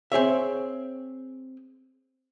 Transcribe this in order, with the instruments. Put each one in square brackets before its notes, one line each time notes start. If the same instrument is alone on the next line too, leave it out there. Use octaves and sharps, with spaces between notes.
[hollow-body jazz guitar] C4 G#4 C#5 E5